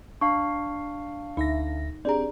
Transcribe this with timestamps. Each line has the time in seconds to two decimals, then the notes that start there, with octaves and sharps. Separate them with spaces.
0.21 D4 F5 C#6
1.37 D2 D#4 E5 A#6
2.05 C4 D4 G4 G#4 D5 A#5